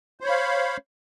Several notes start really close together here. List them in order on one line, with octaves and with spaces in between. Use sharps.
C5 C#5 B5 F5